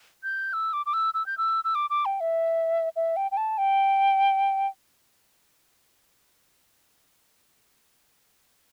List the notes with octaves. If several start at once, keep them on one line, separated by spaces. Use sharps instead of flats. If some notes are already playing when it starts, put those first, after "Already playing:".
G6
E6
D6
D6
E6
E6
G6
E6
E6
D6
D6
G5
E5
E5
G5
G5
A5
G5